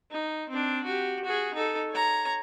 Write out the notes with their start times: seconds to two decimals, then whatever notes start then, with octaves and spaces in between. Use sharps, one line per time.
0.11 D#4
0.49 C4 D4
0.84 F#4 G4
1.24 F#4 G#4
1.54 D#4 A4
1.90 C#5 A#5